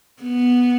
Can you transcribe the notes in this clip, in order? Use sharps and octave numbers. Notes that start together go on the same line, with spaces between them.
B3